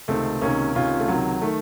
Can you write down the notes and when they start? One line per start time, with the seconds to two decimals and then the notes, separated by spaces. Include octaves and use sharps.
0.08 C#2 C3 D#3 A3 C4
0.41 C#2 C3 D#3 A#3 C#4
0.75 C#2 C3 D#3 C#4 F4
1.00 A3
1.08 C#2 C3 D#3 F#3
1.42 D#3 A3